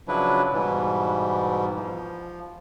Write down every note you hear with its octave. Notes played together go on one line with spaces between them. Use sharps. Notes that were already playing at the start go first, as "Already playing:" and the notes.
C#3 F3 F#3 D4 E4 B4
G#2 B2 E3 G3
F3